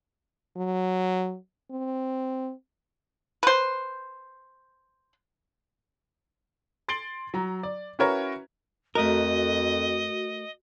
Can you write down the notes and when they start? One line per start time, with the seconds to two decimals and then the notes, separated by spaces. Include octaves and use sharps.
0.57 F#3
1.71 C4
3.43 B4 C5
6.88 C6 A6 C7 D7 F#7 G7
7.34 F#3 A#5
7.63 D5
7.99 C#4 E4 F#4 A#4 B4 C#5
8.95 F2 A3 F#4 A#4 D#5